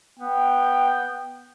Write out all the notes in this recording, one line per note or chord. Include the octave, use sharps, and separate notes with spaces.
B3 G5